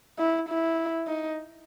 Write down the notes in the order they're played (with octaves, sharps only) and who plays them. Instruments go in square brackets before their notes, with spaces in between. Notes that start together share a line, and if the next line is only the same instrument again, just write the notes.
[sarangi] E4
E4
D#4